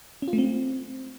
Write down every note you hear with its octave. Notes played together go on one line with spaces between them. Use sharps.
C#4
F4
A3
C4